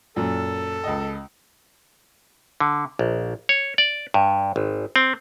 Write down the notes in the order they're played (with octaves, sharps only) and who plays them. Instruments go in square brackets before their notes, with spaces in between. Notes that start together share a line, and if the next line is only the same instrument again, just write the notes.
[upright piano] F#2 A#2 [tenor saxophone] A4
[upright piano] C#2 D#5
[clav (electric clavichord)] D3
A#1
C#5
D5
G2
G#1
C4